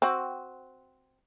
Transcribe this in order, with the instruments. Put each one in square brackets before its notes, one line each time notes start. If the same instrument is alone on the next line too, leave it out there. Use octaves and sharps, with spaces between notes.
[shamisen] C4 F#4